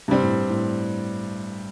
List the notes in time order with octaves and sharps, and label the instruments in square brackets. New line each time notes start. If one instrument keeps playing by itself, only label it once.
[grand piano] G2 G3 C4 [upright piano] C3
[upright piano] A2
A2